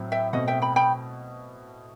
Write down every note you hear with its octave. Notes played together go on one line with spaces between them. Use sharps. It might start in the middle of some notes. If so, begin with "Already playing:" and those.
Already playing: A2 F#3 C4
E5 G5
B2 A3 C4 D#5 F#5
E5 G5
G5 B5
G5 B5